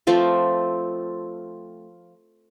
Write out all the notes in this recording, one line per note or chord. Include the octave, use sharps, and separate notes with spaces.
F3 A3 C4